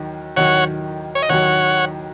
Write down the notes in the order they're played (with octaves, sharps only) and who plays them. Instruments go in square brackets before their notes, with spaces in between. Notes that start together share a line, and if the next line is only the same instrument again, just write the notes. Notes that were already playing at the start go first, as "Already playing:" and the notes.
Already playing: [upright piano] D#2 D#3 F#3
[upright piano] D#2 D#3 F#3 [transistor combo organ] C#5 F#5
[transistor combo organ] C#5
D#5
[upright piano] D#2 D#3 F#3 [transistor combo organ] C#5 F#5